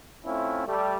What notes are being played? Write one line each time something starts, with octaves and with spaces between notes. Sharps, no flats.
A3 C4 C#4 E4 F4
G3 A3